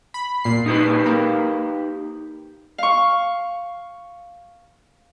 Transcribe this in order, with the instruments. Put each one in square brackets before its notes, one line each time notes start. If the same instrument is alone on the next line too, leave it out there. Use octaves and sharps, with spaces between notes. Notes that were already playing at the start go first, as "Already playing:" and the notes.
[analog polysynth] B5
A#2 C7
[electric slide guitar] D#4 G4 B4
[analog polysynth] A#3
[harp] F5 C#6